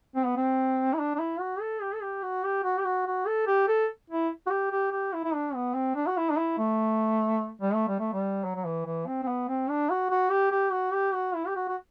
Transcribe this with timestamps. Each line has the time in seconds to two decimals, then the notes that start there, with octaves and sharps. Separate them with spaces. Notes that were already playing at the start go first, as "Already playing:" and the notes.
0.16 C4
0.26 B3
0.37 C4
0.94 E4
0.99 D4
1.15 D4
1.19 E4
1.40 F#4
1.61 A4
1.82 G4
1.94 A4
2.02 G4
2.23 F#4
2.44 G4
2.64 F#4
2.78 G4
2.85 F#4
3.06 F#4
3.27 A4
3.47 G4
3.68 A4
4.10 E4
4.47 F#4
4.50 G4
4.71 G4
4.92 G4
5.13 E4
5.24 E4
5.34 D4
5.55 B3
5.75 C4
5.95 D4
6.07 F#4
6.17 E4
6.30 D4
6.37 E4
6.58 A3
7.62 G3
7.74 A3
7.88 G3
8.00 A3
8.13 G3
8.45 F#3
8.56 F#3
8.66 E3
8.86 E3
9.07 C4
9.23 C4
9.28 B3
9.49 C4
9.69 D4
9.90 F#4
10.11 F#4
10.30 G4
10.51 G4
10.72 F#4
10.93 G4
11.14 F#4
11.35 E4
11.47 G4
11.56 F#4
11.68 F#4